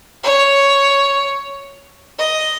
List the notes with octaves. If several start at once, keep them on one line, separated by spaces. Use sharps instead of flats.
C#5
D#5